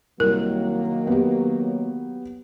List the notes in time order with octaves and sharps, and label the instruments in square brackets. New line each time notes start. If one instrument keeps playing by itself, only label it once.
[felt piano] C2 [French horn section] D#3 F#3 A#3 [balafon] A#4
[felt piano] B3 G4